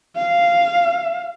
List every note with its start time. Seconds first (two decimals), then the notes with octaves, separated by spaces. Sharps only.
0.16 F5